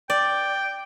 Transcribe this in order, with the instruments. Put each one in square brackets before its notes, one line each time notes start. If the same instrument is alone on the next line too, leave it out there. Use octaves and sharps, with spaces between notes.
[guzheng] D5 [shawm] G5